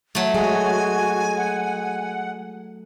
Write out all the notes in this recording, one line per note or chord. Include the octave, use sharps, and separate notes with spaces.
F#3 A3
G#3 F#4 G#5
F#5